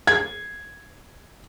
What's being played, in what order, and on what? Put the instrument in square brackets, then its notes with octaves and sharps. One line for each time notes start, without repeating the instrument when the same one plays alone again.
[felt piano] G#6